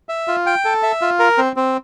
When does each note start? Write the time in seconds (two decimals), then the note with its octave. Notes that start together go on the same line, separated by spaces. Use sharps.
0.09 E5
0.28 F4
0.46 G5
0.65 A4
0.83 E5
1.01 F4
1.19 A#4
1.38 C4
1.56 C4